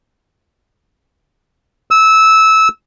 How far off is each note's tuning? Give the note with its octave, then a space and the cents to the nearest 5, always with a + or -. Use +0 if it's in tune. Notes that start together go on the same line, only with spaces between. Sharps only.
E6 -20